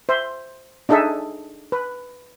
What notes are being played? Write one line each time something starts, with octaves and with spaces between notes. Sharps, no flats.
C5 E5
D4 D#4 G#4 A4 E5
B4